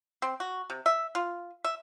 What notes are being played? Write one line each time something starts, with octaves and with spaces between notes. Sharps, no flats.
C4
F#4
C3
E5
F4
E5